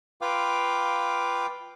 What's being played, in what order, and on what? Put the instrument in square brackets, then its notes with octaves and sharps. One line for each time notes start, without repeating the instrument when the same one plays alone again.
[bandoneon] F4 B4 F5 G5 D6